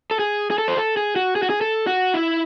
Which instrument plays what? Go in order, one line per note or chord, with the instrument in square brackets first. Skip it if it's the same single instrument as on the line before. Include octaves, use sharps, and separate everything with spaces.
[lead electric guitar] A4
G#4
G#4
A4
C5
A4
G#4
F#4
G#4
F#4
G#4
A4
F#4
E4